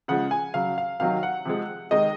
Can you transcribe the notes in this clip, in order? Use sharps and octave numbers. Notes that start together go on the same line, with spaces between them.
C#3 F3 G#3 F#5
G#5
C#3 F#3 F5
F5
C3 D#3 F#3 F5
F#5
C3 F3 G#3
C3 D#3 G#3 D#5